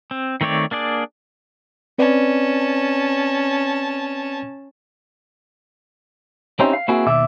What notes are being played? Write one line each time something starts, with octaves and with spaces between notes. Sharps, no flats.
C4
D#3 A3 C4 C#5 D5
A#3 D4 G#4 D5
C4 C#4 B4 D5 A5
C4 C#4 D#4 E4 G4 C5
F5
A#3 C4 E4 F#4 G#4
D#2 B2 D5 E5